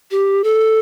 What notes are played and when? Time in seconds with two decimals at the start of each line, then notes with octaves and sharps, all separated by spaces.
0.11 G4
0.44 A4